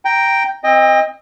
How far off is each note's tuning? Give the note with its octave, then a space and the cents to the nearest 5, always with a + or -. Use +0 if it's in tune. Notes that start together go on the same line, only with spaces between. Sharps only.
G5 +0 A#5 +0
C4 +0 D#5 +0 G5 +35